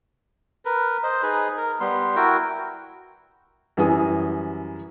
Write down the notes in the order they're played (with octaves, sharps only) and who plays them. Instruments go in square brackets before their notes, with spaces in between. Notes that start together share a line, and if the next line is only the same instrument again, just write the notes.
[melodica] A#4 B4
C5 D#5
D#4 G#4 B4
A#4
G3 B3 C6
E4 F#4 A#4 G5
[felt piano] F#2 E3 G3 G#5 D#6